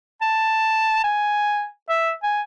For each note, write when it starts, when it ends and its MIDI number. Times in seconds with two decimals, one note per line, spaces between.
0.22 1.01 81
1.04 1.67 80
1.89 2.11 76
2.23 2.42 80